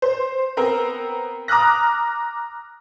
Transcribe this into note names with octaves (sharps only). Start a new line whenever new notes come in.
C5
B3 C4 A#4
A#5 D6 D#6 F6 F#6 A#6